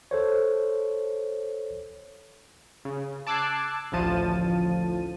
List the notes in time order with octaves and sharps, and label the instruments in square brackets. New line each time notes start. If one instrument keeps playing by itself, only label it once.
[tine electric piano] A4 C5 C#5
[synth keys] C#3
A5 D6 E6 F#6 G#6 C7
A1 D2 F3 A5 D#7